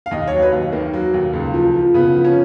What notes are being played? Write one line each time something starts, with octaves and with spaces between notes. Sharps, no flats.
F5
D#2 D#5
F#3 C#5
B4
D#2
D#3 A#3
F#3
D#2
C#2
F3
F3
C#3 B3
F3
C#4